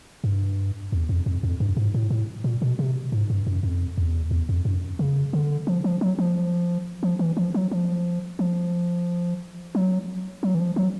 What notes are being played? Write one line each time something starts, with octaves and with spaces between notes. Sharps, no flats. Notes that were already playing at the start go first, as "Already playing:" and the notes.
G2
E2
F2
F2
F2
G2
G#2
A2
A2
A#2
B2
C3
G#2
G2
F#2
F2
E2
E2
F2
F#2
C#3
D3
F3
F3
F#3
F3
F3
E3
F3
F#3
F3
F3
F#3
F#3
E3
F3
F#3